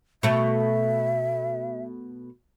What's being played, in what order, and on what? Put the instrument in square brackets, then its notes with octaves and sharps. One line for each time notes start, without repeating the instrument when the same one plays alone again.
[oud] B2 A3 [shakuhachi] E5